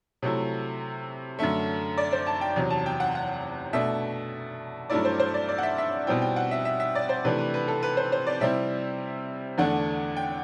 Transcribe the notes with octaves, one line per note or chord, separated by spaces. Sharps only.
C3 F#3 A3 E4
F#2 D3 A3 E5
D5
C5
A5
G5
E2 C3 F#3
A5
G5
F#5
F#5
B2 A3 D4 E5
G2 F#3 A3 E4 D5
C5
C5
D5
D5
F#5
E5
E5
B2 G3 C4 E4 G5
G5
F#5
E5
E5
E5
D5
C5
C3 E3 A3 D4 B4
B4
B4
A4
B4
C5
C5
D5
C3 G3 C4 E4 E5
E2 D3 A3 D4 F#5
G5